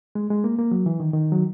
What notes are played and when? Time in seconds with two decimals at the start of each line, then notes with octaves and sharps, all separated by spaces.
0.15 G#3
0.30 G#3
0.44 A#3
0.59 A#3
0.71 F#3
0.86 E3
1.00 D#3
1.13 D#3
1.32 F#3